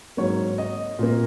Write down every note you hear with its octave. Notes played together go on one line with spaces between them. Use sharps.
G#2 F#3 A#3 C#5
D#5
A#2 A#3